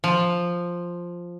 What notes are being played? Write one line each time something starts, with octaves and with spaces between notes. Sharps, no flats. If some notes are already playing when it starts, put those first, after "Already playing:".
F3